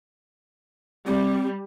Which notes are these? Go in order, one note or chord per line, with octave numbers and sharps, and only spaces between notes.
G3 C4